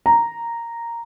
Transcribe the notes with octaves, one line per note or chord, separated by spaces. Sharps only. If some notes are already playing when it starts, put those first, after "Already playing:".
A#5